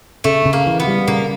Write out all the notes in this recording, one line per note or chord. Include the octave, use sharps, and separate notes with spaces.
C#3 A3
C#3
A#3
E3
B3
G3
C#3 A#3